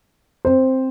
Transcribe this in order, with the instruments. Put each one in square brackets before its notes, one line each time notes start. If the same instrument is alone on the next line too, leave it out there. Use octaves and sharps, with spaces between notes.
[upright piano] C4 C5